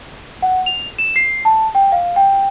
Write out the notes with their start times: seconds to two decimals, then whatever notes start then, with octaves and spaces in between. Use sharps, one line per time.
0.42 F#5
0.66 F7
0.99 E7
1.16 C7
1.45 A5
1.75 G5
1.92 F5
2.16 G5